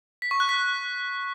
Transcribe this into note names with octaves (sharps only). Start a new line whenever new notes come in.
B6
C#6
F#6
B6